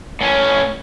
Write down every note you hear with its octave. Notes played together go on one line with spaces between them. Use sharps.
A2 C#4